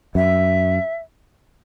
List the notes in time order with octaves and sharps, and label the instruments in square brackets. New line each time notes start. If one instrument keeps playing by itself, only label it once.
[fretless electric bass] F#2 [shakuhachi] E5